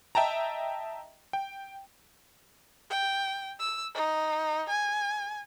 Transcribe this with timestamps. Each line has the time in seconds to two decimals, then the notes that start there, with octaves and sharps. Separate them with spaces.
0.15 D#5 E5 G5 A5 A#5
1.33 G5
2.90 G5
3.60 E6
3.95 D#4
4.70 G#5